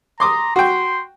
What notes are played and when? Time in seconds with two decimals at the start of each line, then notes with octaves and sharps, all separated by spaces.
0.20 A#5 C6 D6 D#6
0.56 F#4 G5 C6